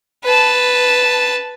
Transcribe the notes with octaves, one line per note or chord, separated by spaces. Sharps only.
B4 A5